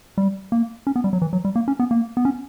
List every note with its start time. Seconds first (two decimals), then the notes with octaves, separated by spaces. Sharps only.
0.18 G3
0.52 A#3
0.87 C#4
0.96 B3
1.04 G3
1.13 F#3
1.22 E3
1.33 F#3
1.45 G3
1.56 A#3
1.68 C#4
1.79 B3
1.91 A#3
2.17 B3
2.25 C#4